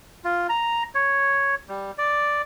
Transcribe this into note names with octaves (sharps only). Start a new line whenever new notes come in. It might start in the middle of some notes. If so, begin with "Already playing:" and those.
F4
A#5
C#5
G3
D5